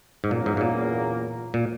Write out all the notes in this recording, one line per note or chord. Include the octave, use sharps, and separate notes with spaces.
G#2
E2 A#2 C#3 F#3 A#3
G#2
G#2
A#2
A#2